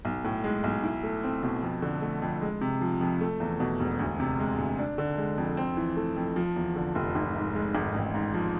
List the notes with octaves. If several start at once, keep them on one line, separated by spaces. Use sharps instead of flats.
B1
A2
G#3
B1
E4
A3
C4
B2
F2
D3
A3
F2
G#3
C3
F3
F2
A3
E2
B2
E1
D2
C3
G#3
D2
D4
D3
G#3
F2
C4
E3
A3
F2
F3
E2
D3
F1
G#1
G#2
G#3
G#1
A1
G#2
F3